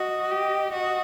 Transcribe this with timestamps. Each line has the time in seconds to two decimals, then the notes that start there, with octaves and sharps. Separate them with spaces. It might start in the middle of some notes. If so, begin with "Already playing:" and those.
Already playing: F#4 D#5
0.31 G4
0.72 F#4 D#5